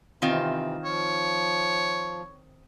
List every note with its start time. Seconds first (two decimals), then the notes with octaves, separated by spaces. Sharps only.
0.22 C3 D#3 E3 C4 F4
0.85 F3 C#5